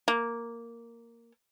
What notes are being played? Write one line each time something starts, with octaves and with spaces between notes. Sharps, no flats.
A#3